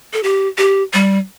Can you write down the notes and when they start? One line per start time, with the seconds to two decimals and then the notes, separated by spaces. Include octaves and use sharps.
0.13 A4
0.23 G4
0.58 G4
0.94 G3